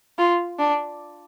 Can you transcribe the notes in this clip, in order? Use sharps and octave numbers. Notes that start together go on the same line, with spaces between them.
F4
D4